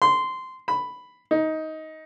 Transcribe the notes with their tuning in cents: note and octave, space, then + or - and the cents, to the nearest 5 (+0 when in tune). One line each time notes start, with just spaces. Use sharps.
C6 -15
B5 +5
D#4 +15